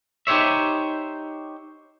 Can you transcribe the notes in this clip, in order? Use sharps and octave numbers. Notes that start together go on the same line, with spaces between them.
D#4 G4 C5 C#5 E5